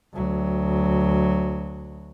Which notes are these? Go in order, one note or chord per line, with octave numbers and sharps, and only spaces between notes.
D2 F#3